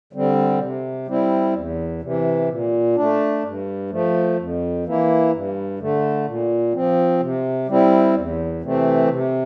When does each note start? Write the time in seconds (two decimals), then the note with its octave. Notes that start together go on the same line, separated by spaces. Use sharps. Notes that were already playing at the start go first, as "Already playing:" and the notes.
0.13 D3 G3 C4
0.60 C3
1.07 G3 C4 E4
1.54 E2
2.02 C3 E3
2.49 A#2
2.96 A3 D4
3.43 G2
3.90 F3 A3
4.37 F2
4.85 E3 A#3 E4
5.32 G2
5.79 D3 A3
6.26 A#2
6.74 F3 C4
7.20 C3
7.68 G3 C4 E4
8.15 E2
8.62 C3 E3 A3 C4
9.09 C3